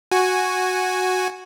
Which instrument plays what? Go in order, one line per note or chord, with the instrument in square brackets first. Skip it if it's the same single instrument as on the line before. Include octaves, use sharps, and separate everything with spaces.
[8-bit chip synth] F#4 G#5